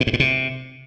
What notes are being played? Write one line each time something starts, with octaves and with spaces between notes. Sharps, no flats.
B2
G#2
A#2
C3